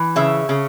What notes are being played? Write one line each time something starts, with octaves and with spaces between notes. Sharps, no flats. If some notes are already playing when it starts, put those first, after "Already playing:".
Already playing: E3
C#3 E5
C#3